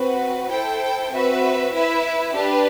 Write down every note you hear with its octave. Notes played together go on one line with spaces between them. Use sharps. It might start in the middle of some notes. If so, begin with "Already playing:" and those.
Already playing: C4 F#4 B4
E4 A4 C5 G5
C4 F#4 B4 E5
E4 B4 E5
D4 G4 B4